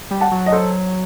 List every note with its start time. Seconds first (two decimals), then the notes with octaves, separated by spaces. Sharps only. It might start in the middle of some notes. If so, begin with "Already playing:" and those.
0.11 G3
0.21 F#5 A5
0.31 F#3
0.46 D#5
0.52 A4 C5